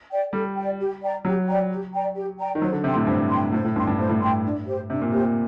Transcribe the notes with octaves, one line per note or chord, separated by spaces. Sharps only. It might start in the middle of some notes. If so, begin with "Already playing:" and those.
D5 G5
G3 A4
D5 G5
G4
D5 G5 A#5
F#3 G4
D5 G5 A#5
G4
D5 G5 A#5
G4
D5 G5 A#5
D#3
F#3 C5
D3
C3 G5 C6
A2
G2 C5
C6
G5
A2 C5
A2
G2 G5 C6
G2
A2 C5
A2
A2 G5 C6
D4
G4 C5
C3 D4
A#2
A#2 G4 C5